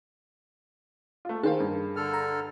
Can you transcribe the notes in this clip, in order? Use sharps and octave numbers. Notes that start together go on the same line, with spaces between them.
A3 F4
D#3 G#4 A#4 C5 F5
G2
D3 A4 F6
A#5